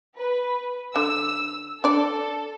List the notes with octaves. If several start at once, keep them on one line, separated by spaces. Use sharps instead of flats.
B4
D3 E6
D4 A4 D5